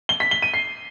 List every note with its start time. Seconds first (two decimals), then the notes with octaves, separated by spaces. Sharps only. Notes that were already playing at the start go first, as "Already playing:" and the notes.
0.09 G7
0.20 B6
0.31 G7
0.42 D#7
0.54 C7